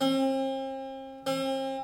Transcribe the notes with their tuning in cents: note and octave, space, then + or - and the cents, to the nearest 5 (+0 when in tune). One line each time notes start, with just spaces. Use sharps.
C4 +40
C4 +40